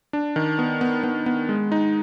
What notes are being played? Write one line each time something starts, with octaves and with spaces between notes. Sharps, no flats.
D4
D#3
B3
B3
B3
B3
G#3
D#4